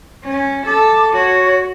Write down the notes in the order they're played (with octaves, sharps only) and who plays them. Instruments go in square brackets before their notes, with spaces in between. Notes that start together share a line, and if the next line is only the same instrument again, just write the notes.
[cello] C#4
[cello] A4 [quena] D6
[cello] F#4 [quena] C#5